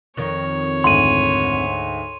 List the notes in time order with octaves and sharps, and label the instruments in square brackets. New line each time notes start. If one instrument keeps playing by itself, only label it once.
[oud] F2 D#3 [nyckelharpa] C#5
[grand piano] D2 G#2 [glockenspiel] C6 D#7